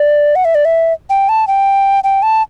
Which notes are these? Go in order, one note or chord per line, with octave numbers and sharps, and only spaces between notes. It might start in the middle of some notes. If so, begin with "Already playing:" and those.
Already playing: D5
F#5
E5
D5
E5
G5
A5
G5
G5
A5